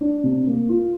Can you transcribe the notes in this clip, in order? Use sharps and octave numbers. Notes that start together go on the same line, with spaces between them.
D4
C3
A#3
F4